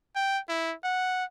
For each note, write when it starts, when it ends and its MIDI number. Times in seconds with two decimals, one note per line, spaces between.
0.16 0.39 79
0.49 0.74 64
0.84 1.25 78